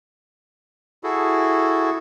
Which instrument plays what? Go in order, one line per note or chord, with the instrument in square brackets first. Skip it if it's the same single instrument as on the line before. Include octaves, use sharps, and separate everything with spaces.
[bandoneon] E4 F#4 G#4 A4